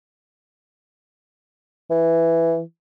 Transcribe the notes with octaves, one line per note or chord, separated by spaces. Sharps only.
E3